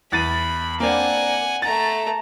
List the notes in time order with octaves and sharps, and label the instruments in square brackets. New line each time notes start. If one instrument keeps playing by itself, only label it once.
[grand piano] E2 A6 D#7 [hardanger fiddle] B5
[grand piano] A#3 C4 D4 [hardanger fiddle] F#5 G#5
[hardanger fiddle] A3 A#5 [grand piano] A6